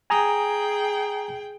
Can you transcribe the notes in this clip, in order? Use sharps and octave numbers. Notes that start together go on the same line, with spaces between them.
G#4 G5 G#5 A#5 D#6